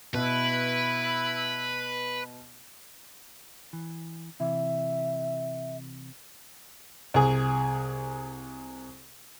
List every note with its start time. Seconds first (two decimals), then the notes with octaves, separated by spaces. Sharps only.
0.14 B2 E4 B4
3.73 E3
4.40 C3 E3 E5
7.14 C2 G#4